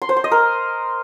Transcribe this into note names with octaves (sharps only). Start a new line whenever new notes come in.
C6
C5
C6
D#5
A#4